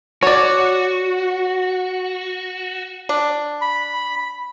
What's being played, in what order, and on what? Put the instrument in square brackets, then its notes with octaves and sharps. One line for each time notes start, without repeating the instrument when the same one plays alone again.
[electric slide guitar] F#4 [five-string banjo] C#5 D5
[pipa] D4
[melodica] B5